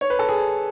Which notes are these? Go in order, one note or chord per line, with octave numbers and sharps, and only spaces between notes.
C#5
B4
A4
G#4